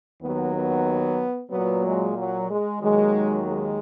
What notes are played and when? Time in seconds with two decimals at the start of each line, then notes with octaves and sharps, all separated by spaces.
0.20 D#2 D#3 F#3 B3
0.54 B3
1.51 A#2 F#3 B3
1.84 G#3
2.17 F#3
2.49 G#3
2.82 D#2 D#3 F#3 G#3
3.47 G#3